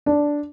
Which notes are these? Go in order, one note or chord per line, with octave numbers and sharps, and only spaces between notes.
D4